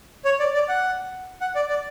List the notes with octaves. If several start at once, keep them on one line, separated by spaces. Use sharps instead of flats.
C#5
D5
D5
F#5
F#5
D5
D5